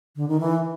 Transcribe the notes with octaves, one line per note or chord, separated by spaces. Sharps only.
D3
D#3
E3